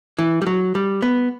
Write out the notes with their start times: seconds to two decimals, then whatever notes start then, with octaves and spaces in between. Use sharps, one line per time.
0.19 E3
0.42 G3
0.47 F#3
0.75 G3
1.02 B3